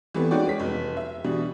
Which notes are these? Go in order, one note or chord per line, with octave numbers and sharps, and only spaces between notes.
E3 G3 A3 B3 C4
G#3 C#4 D#4 F#4 D5 G5
G#3 C#4 B6
F1
E5
B2 D3 E3 G3